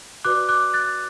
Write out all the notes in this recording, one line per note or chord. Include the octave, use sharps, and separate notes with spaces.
F#4 B4 D5 D6 F#6
D6 F#6
F#6 A6